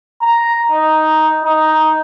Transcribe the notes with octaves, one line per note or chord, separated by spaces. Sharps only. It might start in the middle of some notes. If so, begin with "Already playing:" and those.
A#5
D#4
D#4